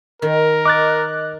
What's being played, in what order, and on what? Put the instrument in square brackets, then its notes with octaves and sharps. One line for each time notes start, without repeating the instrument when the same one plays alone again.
[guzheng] D#3 [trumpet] A#4
[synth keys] D#5 F#6 [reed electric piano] D6 A6